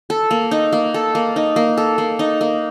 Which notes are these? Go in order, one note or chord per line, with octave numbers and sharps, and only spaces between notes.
A4
A#3
D#4
A#3
A4
A#3
D#4
A#3
A4
A#3
D#4
A#3